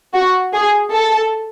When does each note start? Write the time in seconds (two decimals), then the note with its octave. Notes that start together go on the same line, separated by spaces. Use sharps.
0.14 F#4
0.54 G#4
0.93 A4